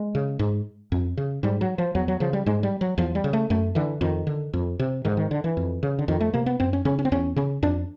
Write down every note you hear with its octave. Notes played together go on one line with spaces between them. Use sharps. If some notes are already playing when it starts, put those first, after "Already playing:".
Already playing: G#3
C#3
G#2
F2
C#3
G#2 G3
F#3
F3
E2 F#3
F#3
C#3 F3
G3
G#2 G#3
G3
F#3
E2 F3
G3
C#3
A3
F#2 A3
D3 E3
F2 D#3
D3
F2
C3
G#2 D#3
D3
D#3
D3
E3
F2
C#3
D3
F2 D#3
A3
C3 A#3
B3
F#2 C4
C#4
C#3 C#4
C#4
C4
E2 C#4
C#3 C#4
F2 D4